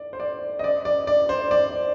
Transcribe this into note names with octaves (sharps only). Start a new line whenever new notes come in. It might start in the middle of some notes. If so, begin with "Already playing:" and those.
Already playing: D5
C5
D5
D#5
D5
D5
D5
C5
D5